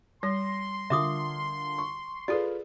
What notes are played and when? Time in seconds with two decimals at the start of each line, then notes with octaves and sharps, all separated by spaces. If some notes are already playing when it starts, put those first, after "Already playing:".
0.23 G3 C6 A#6
0.90 D3 F4 A#4 E5 D6 D#6
1.78 C#6
2.28 F4 G#4 A4 B4 D5